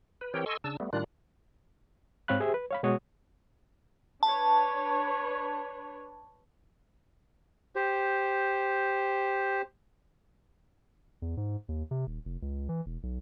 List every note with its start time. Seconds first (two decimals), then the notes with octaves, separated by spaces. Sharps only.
0.21 B4
0.34 E3 C4 G4 A#4 C#5 G5
0.46 A4 D#5 G#5 C6 C#6 E6
0.64 C#3 D4 A5 E6
0.80 G3 A3 B3
0.93 A2 D#3 G3 D4 F4 F#6
2.28 G#2 C4 C#5 F5 B5 F#6
2.40 G4 G#4 C5 E5
2.54 B4
2.71 C#5 F5 B5
2.83 B2 G#3 F#4 C#5 D#6
4.23 D4 B4 C#5 A5
7.76 G4 C5
11.22 E2
11.37 G#2
11.69 D#2
11.91 C3
12.07 D#1
12.25 F1
12.42 C#2
12.69 E3
12.86 E1
13.03 B1